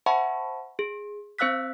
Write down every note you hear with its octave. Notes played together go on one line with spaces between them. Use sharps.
C5 E5 F#5 A5 B5 C#6
G#4
C4 C5 F5 E6 F#6 B6